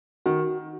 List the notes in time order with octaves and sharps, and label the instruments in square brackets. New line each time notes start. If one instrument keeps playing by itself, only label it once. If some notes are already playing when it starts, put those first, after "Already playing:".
[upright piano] D#3 [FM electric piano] F#4